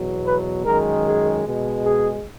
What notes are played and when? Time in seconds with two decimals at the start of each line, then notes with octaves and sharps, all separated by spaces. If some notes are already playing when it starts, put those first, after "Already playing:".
Already playing: E2 B2 F#3
0.26 B4
0.65 F#2 D#3 G#3 A#4
1.05 G#4
1.45 B2 G#3
1.84 G#4